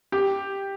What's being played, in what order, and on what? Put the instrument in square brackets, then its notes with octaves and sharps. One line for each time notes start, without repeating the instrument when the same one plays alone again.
[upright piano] G4